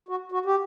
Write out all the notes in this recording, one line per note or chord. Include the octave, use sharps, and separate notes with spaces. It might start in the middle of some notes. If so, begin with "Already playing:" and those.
F#4
F#4
G4